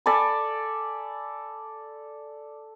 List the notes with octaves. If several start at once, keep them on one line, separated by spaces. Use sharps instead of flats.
A4 D5 G#5 B5